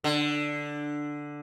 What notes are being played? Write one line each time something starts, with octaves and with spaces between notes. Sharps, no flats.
D3